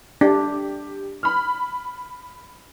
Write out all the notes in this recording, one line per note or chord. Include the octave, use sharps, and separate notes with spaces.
D4 G4
B5 F6